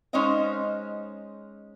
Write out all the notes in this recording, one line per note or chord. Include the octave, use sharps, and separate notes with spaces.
G#3 C#4 D#4 C5 D#5 F5